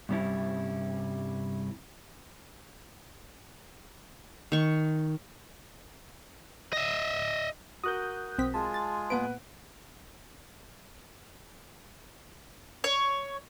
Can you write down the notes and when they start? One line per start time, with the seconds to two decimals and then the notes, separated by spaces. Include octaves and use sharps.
0.09 G2 C3 G3 C#4 E4
4.52 D#3 C#6
6.73 D#5 E5
7.84 F#4 A#4 D#6 F#6 G6
8.38 B1 C4 B6
8.54 G#3 F4 G#4 A5
8.74 A6
9.10 A#2 B3 B4 F#5 D7
12.84 C#5